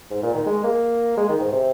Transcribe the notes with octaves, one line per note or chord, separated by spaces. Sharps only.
G#2
A#2
D#3
G#3
A#3
G#3
D#3
G#2
C3